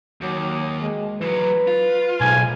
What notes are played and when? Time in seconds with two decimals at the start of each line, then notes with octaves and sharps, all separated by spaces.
0.21 D#2 F#3
0.81 G#3
1.21 E3 F#3 B4
1.67 F4
2.21 B1 G#2 G#5